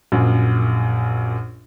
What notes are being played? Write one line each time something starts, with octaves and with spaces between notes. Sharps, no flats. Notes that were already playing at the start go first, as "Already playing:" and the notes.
A#1 F#2